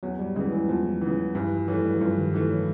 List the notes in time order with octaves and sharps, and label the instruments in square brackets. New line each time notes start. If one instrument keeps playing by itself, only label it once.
[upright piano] E2 [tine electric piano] F#3
[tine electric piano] G3
[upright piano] C#3 E3 [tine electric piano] G#3
[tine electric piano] E3
[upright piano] E2 [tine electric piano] F3
[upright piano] C#3 E3
[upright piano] G2 [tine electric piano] E3
[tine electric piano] F3
[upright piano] E3 A3 [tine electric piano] F#3
[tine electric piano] G3
E3
[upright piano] G2 [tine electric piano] F3
[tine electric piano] D#3
[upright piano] E3 A3
[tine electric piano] F#3